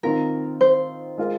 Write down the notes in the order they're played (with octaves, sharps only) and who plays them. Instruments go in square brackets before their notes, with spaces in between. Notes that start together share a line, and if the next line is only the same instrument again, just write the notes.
[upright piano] D#3 C4 F4 [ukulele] A#4
[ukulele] C5
[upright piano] G#3 F4 A#4